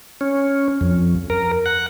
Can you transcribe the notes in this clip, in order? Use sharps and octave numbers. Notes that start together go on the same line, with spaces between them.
C#4
F2
A#4
F#5